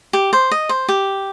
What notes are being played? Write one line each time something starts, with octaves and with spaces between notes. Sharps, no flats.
G4
C5
D#5
C5
G4